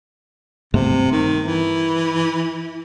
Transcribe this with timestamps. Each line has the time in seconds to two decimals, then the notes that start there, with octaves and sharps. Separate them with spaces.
0.74 G2 C3 A3 B3
1.12 D#3
1.46 E3